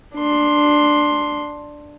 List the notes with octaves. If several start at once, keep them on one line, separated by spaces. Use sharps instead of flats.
D4 C6